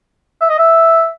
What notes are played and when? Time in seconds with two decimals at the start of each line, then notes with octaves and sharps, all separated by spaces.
0.41 E5
0.50 D#5
0.59 E5